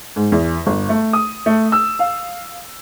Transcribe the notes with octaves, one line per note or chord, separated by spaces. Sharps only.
G#2
E2
G1
A3
D#6
A3
E6
F5